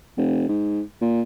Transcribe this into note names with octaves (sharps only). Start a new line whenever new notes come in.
F1
G#2
A#2